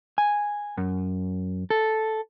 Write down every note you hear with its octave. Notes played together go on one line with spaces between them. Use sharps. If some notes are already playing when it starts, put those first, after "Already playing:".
G#5
F#2
A4